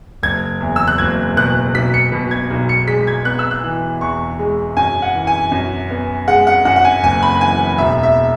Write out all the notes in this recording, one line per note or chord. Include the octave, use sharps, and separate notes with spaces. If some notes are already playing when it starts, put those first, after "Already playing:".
F#1 G#6
E2
E6
F#6
F#1 G#6
B2 F#6
B1 B6
C#7
B2
G#6
B1
C#7
G#3 B6
G#6
B3 F#6
E6
F#6
E3
E2 C#6
G#3
F#2 G#5
F#5
E3
G#5
F#2
B3
G#3 F#5
F#5
F#2 F#5
F#5
G#5
F#1 G#5
B5
E3 G#5
E1 E5
E5